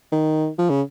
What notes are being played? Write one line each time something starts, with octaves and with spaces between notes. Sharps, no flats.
D#3
F3
C#3